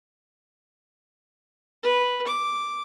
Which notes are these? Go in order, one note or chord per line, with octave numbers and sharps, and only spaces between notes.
B4
D6